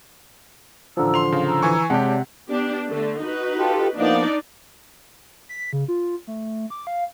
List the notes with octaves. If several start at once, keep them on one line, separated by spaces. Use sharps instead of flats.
A1 D3 F3 E4 A#5 E6
C6 F7
C#3 F5
A#5 E6
E3 G#5 C#6
C3 G#3 G4 C#5 D5 F#5 A5
B3 D4 G4
D3 A3
D#4 F#4 B4
F4 G4 A4
F3 A#3 B3 D4 D#4 D5
B6
C#3
F4
A3
D6
F5